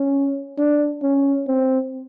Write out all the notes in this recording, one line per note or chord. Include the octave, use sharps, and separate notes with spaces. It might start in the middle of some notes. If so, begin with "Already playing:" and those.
Already playing: C#4
D4
C#4
C4